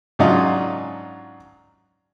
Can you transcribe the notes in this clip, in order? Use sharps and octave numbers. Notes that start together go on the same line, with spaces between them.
G#2 C#3 F#3 D4 F4 D#5